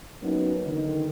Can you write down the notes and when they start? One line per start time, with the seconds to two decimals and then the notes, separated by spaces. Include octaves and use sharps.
0.22 F#3 A#3 B3 C#4 D#4
0.63 D3 D#3